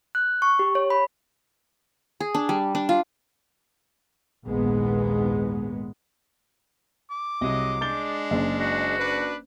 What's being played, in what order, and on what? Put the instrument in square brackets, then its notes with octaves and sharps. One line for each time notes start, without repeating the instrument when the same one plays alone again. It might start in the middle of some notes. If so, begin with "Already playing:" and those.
[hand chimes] F#6
C#6
G4
C#5
B5
[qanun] G#4
D4
G3
D4
F4
[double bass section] A#1 D#2 G#2 G#3 B3
[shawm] D6
[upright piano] C2 [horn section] F#3 G#3 D#5
[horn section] G#3 D4 [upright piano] G6 A6 G7
[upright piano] F#1
[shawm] F#4
[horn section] D4 B4